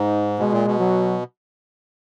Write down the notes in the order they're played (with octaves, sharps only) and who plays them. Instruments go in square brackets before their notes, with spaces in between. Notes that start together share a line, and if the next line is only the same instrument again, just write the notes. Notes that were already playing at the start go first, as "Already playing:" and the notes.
Already playing: [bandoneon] G#2 [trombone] D#4
[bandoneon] B2 [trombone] G#3
[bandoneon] A#2
B2
[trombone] F#3